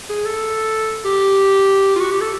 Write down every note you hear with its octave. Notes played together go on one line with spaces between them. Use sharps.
G#4
A4
G4
F4
F#4
G4
A4